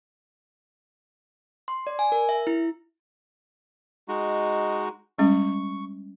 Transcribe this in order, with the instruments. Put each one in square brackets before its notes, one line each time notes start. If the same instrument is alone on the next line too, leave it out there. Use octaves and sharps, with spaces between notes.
[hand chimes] C6
D5
G#5
A#4
E5
E4
[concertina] G#3 D#4 F#4
[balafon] G3 G#3 C#4 [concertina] C#6